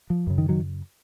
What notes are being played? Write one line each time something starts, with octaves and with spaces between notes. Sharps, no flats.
F3
F#2 C#3
D#3
D#3 F#3